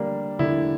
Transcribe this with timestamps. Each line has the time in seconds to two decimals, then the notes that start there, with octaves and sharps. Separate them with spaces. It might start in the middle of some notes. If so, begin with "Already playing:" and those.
Already playing: D3 G3 A#3 D4
0.39 D3 E4